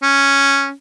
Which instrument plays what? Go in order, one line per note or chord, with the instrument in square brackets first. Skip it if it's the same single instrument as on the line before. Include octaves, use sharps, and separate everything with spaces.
[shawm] C#4